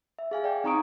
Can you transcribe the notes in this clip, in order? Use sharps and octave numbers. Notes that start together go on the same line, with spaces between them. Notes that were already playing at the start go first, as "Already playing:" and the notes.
E5
G#4 F5 G#5
D5 G5
C4 D#4 A#5 C#6 D#6 D7